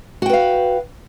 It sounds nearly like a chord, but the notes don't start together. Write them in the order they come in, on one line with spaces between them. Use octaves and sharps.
F#4 G5 B4 F5